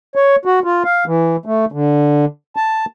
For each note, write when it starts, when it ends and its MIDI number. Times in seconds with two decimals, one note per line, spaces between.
0.15 0.36 73
0.45 0.59 66
0.64 0.83 65
0.85 1.04 77
1.06 1.36 52
1.46 1.65 57
1.72 2.25 50
2.56 2.85 81